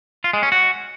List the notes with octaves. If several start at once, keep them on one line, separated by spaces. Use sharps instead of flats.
F4
G#3
C#4
F#4